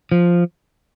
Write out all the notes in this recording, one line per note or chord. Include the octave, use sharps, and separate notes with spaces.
F3